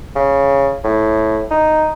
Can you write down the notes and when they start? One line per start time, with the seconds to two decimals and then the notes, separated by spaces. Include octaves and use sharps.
0.16 C#3
0.84 A2
1.51 D#4